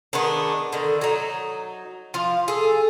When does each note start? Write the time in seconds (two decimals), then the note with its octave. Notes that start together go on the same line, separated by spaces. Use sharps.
0.13 D#3 G#3 B3 D4
0.72 D3 D#3
1.01 F#3 D#4
2.14 F3 F4
2.48 G#4 A4